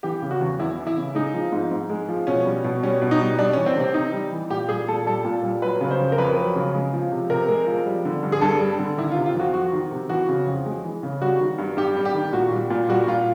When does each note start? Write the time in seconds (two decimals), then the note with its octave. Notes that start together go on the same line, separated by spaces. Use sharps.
0.03 E3 G4
0.22 C#3
0.31 F#4
0.41 E2
0.59 E2 E4
0.78 E3
0.87 E4
0.97 C#3
1.15 G#3 D#4
1.34 F3
1.52 G#2
1.71 G#2
1.89 G#3
2.09 F3
2.27 B2 C#4
2.45 G3
2.64 B2
2.83 G3 C#4
3.02 B2
3.11 D#4
3.20 G3
3.39 G3 D4
3.53 C#4
3.57 E3
3.66 C4
3.77 C3 C4
3.94 C3 D#4
4.13 G3
4.33 E3
4.50 A#2 G4
4.69 G3 G#4
4.88 A#2 A4
5.06 G3 A4
5.25 A#2
5.43 G3
5.62 F#3 B4
5.81 C#3
5.91 C5
5.99 F2
6.12 A#4
6.18 F2 B4
6.38 F#3
6.55 C#3
6.74 G#3
6.93 F3
7.11 C3
7.30 C3 A#4
7.48 G#3
7.67 F3
7.86 G3
8.05 D3
8.23 G2
8.32 G#4
8.41 G2 A4
8.60 G3
8.79 D3
8.97 D#3 E4
9.12 F4
9.16 C3
9.26 F4
9.35 F2 F#4
9.54 F2 F#4
9.73 D#3
9.91 C3
10.09 E3 F#4
10.29 C#3
10.47 F2
10.66 G#3
10.85 E3
11.03 C#3
11.22 G3 F#4
11.40 D#3
11.58 G2
11.77 G2 G4
11.97 G3
12.05 G4
12.14 D#3
12.33 A#2 F#4
12.52 G3
12.70 A#2
12.88 G3 F#4
13.07 A#2 F4